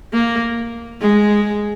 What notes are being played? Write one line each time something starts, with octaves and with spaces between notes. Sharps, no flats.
A#3
G#3